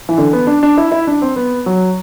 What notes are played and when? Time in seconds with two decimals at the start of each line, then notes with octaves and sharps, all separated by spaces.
0.09 E3
0.18 D3
0.33 B3
0.47 D4
0.63 D4
0.78 E4
0.92 E4
1.07 D4
1.22 C4
1.36 B3
1.66 F#3